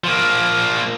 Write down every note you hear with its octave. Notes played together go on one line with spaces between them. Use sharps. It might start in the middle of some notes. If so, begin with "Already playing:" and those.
F3 A#3